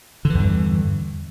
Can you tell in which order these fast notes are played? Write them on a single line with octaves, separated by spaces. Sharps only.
D3 E3 E2 G2